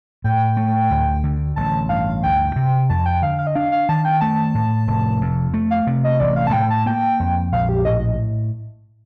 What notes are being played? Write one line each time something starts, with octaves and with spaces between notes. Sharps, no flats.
A2 G5
A3
D2
D3
A1 A5
G2 F5
D2 G5
C3
F2 A5
G5
D3 F5
F5
D#5
D4 F5
F5
D#3 A5
G5
A3 A5
A2
F1
F2
A3
F5
C3
D#5
A1 D5
F5
A5
A2 G5
A5
A#3 G5
F2
A#1 F5
G4
A2 D#5